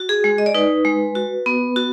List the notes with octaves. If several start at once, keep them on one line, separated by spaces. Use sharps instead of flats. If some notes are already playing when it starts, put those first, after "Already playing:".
Already playing: F#4
G#4
G#3
D#5
D5
D#4 B4
G#3
F#4
B3
F#4